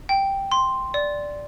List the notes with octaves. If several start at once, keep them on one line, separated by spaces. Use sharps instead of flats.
G5
C6
D5